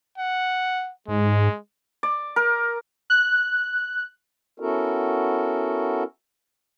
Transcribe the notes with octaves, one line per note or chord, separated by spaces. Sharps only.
F#5
G#2 G#3
D5
A#4
F#6
B3 C#4 E4 F#4 A4 A#4